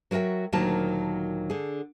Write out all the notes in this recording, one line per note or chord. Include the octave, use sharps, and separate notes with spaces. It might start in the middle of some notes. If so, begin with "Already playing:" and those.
F#3 F#4 A#4 E5 G5
D2 A#2 D#3 F#3 A#4 A5
D3 G#4